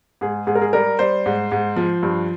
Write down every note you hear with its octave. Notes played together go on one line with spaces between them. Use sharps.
G#2 G#4
G#2 G#4
A#4
G#4
G3 A#4
G3 C5
G#2
G#2
F3
G2